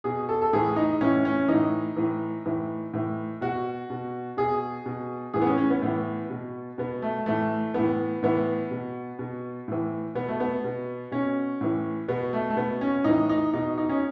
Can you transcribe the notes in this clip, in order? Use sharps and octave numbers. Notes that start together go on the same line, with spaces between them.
B2 G#4
A4
A4
A2 E3 G#4
D#4
A2 E3 C#4
C#4
E3 D#4
A2
A2 E3
A2 E3
A2 E3
B2 F#4
B2
B2 G#4
B2
A2 E3 G#4
B3
C#4
C#4
B3
A2 E3 B3
B2
B2 B3
A3
A2 E3 A3
A2 E3 B3
A2 E3 B3
B2
B2
A2 E3
B2 B3
A3
B3
B2
B2 C#4
A2 E3
B2 B3
A3
A3
B2 B3
C#4
A2 E3 D#4
D#4
B2 D#4
D#4
C#4